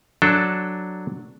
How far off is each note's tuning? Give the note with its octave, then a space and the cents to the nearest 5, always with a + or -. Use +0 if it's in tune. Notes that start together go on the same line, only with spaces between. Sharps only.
F#3 +0 D4 +0 A4 +0